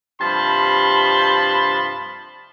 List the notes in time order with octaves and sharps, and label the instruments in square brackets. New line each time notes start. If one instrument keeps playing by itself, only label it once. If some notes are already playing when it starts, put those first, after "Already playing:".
[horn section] G2 C3 F3 A5 B5 C6